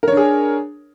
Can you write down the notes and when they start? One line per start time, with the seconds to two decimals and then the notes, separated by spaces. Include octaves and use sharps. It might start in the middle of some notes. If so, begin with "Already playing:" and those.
0.03 A#4
0.08 C#5
0.12 D4
0.17 G#4